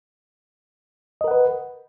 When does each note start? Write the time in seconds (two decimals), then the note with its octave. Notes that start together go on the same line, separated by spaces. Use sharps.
1.21 D#5
1.24 A#4
1.28 F#5
1.31 B4